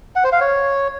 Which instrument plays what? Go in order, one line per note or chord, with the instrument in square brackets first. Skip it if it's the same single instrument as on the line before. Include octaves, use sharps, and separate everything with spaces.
[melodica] F#5
C5
F5
C#5